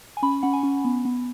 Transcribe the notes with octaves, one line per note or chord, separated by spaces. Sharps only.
G#5
C#4 B5
C#4 F#5
G#5
C#4
B3
B3